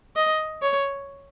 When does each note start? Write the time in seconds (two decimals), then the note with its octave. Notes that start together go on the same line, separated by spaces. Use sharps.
0.16 D#5
0.62 C#5